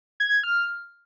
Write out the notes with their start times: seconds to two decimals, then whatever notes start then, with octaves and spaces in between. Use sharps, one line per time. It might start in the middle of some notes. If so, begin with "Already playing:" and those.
0.20 G#6
0.32 G#6
0.44 F6